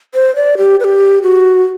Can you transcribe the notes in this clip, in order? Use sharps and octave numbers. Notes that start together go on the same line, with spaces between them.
C5
D5
G4
B4
G4
F#4